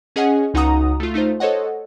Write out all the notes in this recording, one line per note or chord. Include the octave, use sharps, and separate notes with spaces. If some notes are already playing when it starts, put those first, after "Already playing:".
C#4 G#4 D#5 F#5 G#5
C#2 D#4 F#4 F#5 A#5 D#6
A3 F4
A3 D#4 F4 C5
A4 C5 C#5 D#5 F#5